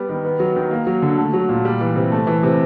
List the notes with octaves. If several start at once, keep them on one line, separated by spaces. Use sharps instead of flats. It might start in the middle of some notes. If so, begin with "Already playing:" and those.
Already playing: G3 B3
D#3
B3
F#3
D#3
A#3
F#3
D3
A3
F#3
A#2
G3
E3
C3
A3
E3
C3